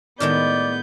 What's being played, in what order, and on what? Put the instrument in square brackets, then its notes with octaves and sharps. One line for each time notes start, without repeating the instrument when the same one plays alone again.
[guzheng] A2 D#3 G#3 [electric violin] B3 G6 [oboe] D5